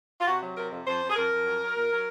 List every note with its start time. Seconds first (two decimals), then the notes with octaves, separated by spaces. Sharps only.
0.21 F4
0.27 C3 F#4
0.42 F#3
0.56 C3 A#4
0.72 F2
0.86 F2 C5
1.01 F2
1.10 G#4
1.15 F2 A#4
1.30 F2
1.45 F#3
1.61 F#3
1.75 A#2
1.89 F#3